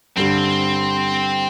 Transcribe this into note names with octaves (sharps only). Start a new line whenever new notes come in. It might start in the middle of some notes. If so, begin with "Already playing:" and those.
G2 D3 G3 C4